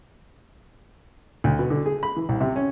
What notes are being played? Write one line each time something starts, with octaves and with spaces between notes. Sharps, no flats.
D2
B2
D3
G#4
B5
E3
C2
C3
C#4